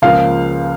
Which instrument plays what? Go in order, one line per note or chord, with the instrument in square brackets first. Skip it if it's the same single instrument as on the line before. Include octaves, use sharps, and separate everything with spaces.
[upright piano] C#2 C#3 F3 A#3 [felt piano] F5